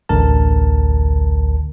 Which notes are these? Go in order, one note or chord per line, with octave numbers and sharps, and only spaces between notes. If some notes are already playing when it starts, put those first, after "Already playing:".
A1 D2 D3 A#4 A5